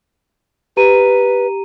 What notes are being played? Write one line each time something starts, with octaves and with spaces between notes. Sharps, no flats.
G4 B4 A#5 D#7